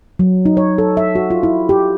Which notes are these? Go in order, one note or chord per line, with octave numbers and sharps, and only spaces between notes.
F#3
D#4
C#5
A4
E5
F#4
F4
E4
G4